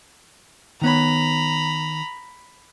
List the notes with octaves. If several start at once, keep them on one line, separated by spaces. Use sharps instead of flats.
D#3 B3 C#5 A#5 B5